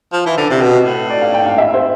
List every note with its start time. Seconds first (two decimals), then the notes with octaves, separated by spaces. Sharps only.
0.13 F3
0.26 E3
0.37 D3
0.50 C3
0.62 B2
0.85 A2
1.10 D5
1.22 F5
1.34 G5
1.46 F5
1.58 E5
1.74 C5